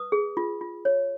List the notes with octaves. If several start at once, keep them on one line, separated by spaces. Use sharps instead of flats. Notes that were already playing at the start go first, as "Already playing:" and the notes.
Already playing: B4 D#6
G#4
F4
F4
C#5